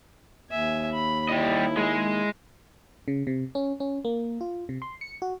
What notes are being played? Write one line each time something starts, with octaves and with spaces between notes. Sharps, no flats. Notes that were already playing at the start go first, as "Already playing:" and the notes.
D#2 E5 G#5
B5
G3 E4 D#5
G#3 G#4
C#3
C3
C#4
C#4
A#3
F4
C3
C6
C#7
F#4